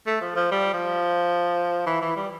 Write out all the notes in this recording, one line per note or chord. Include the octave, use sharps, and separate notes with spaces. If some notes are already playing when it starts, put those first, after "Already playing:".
A3
F3
F3
G3
F3
E3
E3
G3